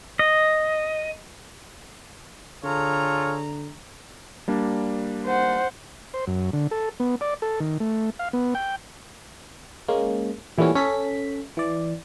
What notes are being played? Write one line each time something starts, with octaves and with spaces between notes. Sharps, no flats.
D#5
D3 F4 G#4 A4 C#5 A#5
G3 A#3 D4
C5 F#5
C5
F#2
D3
A4
B3
D5
A4
D#3
A3
F5
B3
G5
G#3 A#3 C#4
A#2 E3 G3 A3 B3 C#4
C#4 A4 B6
E3 D5